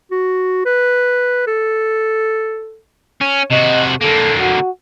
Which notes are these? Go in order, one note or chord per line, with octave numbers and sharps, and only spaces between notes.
F#4
B4
A4
C#4
C3 F#4 D#5
D3 A#3 A4
F#4